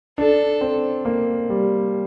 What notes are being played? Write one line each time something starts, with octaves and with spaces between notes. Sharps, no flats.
D4 A4
C4
A#3
G3